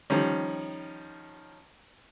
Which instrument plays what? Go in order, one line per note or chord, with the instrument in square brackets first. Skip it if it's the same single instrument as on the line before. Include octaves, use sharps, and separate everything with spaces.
[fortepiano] D#3 F3 G3 C#4